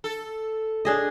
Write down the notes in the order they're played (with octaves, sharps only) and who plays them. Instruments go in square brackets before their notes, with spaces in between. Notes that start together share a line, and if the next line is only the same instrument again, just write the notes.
[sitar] A4
[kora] D4 G#4 D#5